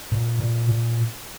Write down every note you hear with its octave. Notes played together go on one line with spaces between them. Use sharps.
A#2
A#2
A#2